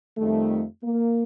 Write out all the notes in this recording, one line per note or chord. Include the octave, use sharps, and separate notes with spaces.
F2 D#3 G3 A3
A#3